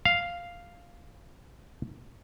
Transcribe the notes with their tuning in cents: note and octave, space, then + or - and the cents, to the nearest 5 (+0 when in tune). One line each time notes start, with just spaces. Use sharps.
F5 +0